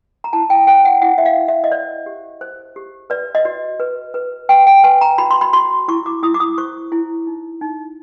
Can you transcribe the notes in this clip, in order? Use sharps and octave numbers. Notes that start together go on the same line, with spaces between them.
A#5
E4 A5
G5
C5 G5
F#5
E4 F#5
E5
F5
E4
E5
D#5
C5 D5
G4
C5
G4
B4 D5
D#5
F#4 D5
B4
B4
B4 G5
G5
B4 G#5
A#5
F#4 B5
C6
B5
F#4 C6
E4 C#6
D6
E4 D#6
D6
D#6
C5 C#6
E4
D#4
D#4